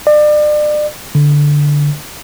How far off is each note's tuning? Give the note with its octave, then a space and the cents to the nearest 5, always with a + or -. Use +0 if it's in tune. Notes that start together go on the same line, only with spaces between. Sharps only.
D5 +35
D3 -10